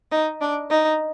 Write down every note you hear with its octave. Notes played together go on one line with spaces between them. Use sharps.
D#4
D4
D#4